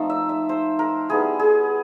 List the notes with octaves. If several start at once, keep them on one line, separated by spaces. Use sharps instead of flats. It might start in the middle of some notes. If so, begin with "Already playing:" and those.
Already playing: F3 A3 C4 D#4
E5
E5
C5
A#4
G3 B3 E4 G#4
G#4